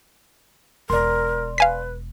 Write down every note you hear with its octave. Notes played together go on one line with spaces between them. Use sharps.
E1 A#4 D5 C6
B4 F5 G#5 B6